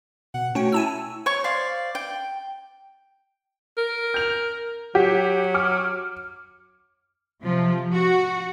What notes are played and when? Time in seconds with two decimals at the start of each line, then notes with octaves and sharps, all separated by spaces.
0.34 B2 F#5
0.55 A3 C#4 F#4 C#5 G5
0.72 E4 G#5 A5 E6
1.26 C#5 C#6
1.44 C5 D5 F5
1.95 G5
3.77 A#4
4.14 G6 F7
4.95 F#3 G4
5.54 D6 F6 C#7
7.42 C3 F3
7.92 F#4